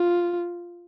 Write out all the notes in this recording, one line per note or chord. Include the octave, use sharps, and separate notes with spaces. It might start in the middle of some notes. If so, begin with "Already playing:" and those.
Already playing: F4